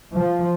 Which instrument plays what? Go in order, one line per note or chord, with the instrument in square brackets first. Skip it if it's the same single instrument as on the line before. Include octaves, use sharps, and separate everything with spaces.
[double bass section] F3